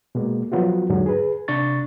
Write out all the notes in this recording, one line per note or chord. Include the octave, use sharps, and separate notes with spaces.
B2 G#3 A#3
F3 F#3 B3 F4 F#4
E2 G#2 D3 F#3
G#4 B4
C3 D4 C#6 A6